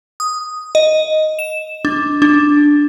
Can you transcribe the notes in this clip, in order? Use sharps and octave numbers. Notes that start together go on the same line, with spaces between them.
D#6
D#5
E7
D4
D4